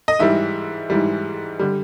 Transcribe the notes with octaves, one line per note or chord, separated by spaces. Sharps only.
D#5
G#2 E3 G3 E5
G#2 E3 G3
D3 G3